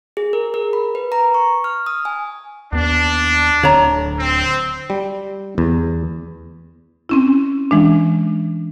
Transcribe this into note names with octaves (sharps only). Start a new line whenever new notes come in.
G#4
A#4
A#4
B5
B4
A#5
C#6
F6
D#6
G#5
D#2 B3 D4
D1 D3 C#5 A#5
C4
G3
E2
C4 C#4 E4
E3 G#3 D4